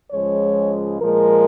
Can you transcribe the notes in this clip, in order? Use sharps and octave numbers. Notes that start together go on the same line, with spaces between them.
C#2 C#3 F3 G#3 C#5
A#2 F3 G#3 A#4